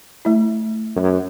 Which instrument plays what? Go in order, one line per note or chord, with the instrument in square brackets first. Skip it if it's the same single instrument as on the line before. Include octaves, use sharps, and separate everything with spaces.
[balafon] A3 E4
[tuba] F#2